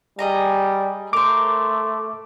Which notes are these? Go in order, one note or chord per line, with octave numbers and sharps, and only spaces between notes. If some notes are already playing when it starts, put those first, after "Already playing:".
G3 G#4 D#5 A#5
A3 A#4 C5 D6